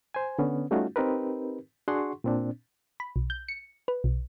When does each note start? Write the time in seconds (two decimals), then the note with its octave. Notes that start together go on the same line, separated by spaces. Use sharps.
0.14 C5 G#5
0.39 D3 B3 C#4
0.71 G3 A3 C#4 D#4 F4 F#4
0.96 C4 D#4 G4 A#4 B4
1.88 D4 F#4 G#4 F#5 C6 C#6
2.24 A#2 C4 D4
3.00 B5
3.16 B1
3.30 G6
3.48 C#7
3.88 B4
4.04 B1